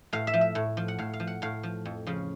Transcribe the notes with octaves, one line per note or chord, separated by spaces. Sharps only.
A2 F5
E5
F3
E5
A2
F3
F#5
A2 F5
F5
F3
F#5
A2 F5
F3
F2
C#3 F3